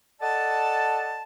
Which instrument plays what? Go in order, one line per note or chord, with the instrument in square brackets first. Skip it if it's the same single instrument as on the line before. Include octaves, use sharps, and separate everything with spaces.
[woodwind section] A4 D5 D#5 F#5 A5